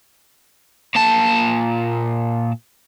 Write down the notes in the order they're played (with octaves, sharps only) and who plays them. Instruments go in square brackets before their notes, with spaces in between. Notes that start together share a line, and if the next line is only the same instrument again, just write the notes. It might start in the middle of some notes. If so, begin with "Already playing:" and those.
[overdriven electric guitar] A#2 A5